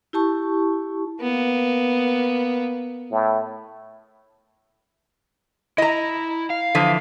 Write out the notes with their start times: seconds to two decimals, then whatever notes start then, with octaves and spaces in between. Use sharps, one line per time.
0.13 E4 G4 A5 C#6
1.21 A#3 B3
3.11 A2
5.78 E4 D#5 A#5
6.50 F5
6.75 D3 E3 F3